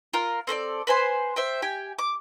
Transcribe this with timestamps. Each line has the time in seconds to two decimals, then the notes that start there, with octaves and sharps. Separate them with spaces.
0.13 F4 A#4
0.47 C4 A4 C5 D5
0.87 B4 C5 G#5 C6
1.36 C5 E5 G5
1.62 G4 G5 G#5
1.99 D6